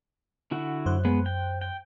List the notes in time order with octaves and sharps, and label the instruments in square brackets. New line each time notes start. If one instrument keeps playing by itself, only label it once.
[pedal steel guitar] D3 E4 F#4
[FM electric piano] F#2 C5 F#6
[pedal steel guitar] G#3 B3
G5
G5